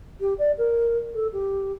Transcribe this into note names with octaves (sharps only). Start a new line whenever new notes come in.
G4
D5
A#4
A4
G4